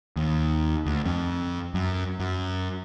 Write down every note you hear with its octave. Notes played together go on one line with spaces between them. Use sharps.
D#2
D2
F2
F#2
F#2